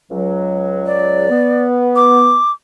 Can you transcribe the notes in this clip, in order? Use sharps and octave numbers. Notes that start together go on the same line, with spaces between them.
C#2 F#3
D5
B3
D6